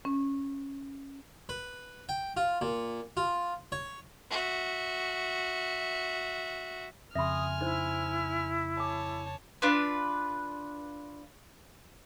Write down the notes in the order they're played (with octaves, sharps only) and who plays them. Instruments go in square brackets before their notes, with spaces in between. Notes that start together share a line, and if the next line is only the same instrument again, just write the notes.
[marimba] C#4
[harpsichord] B4
G5
F4
A#2
F4
C#5
[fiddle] F#4 E5
[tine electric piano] F2 C#3 C6 [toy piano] E5 B5 [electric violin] G#5 F6 [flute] D#6
[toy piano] D#4 C5 [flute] E4
[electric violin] C#5 A5 [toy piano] G#5 D6
[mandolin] D4 F4 B4